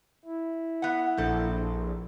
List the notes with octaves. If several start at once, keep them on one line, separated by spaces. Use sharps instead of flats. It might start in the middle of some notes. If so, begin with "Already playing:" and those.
E4
B3 F#5
A#1 C4 A4